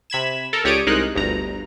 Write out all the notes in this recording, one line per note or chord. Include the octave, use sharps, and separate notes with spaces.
C3 B5 G#6 E7
A4 A#4
C#2 G4 C#5 D5 D#6 D7
C2 G#3 D#4 A#4 F#6
G1 D2 G2 A#5